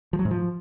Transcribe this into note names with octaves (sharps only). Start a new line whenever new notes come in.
F3
F#3
G#2
F3